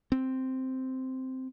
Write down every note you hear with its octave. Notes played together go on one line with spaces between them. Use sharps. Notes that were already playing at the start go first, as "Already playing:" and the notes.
C4